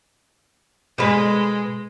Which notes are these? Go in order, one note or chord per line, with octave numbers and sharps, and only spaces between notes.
B2 G#3 B4